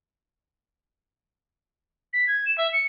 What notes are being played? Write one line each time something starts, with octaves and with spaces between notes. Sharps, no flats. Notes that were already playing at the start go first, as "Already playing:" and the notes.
B6
G#6
E7
E5
C#7